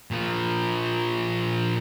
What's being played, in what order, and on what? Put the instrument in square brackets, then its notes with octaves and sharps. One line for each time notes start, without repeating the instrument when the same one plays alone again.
[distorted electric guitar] A#2 F3